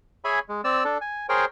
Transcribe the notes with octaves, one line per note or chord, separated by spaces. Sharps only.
G#4 C#5 E5 G#5 B5
G#3
C4 D5 E6
D4 A4
G#5
G#4 A#4 C5 C#5 G5